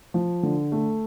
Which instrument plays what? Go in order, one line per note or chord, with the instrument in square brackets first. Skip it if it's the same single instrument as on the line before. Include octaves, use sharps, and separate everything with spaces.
[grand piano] F3
D3
A3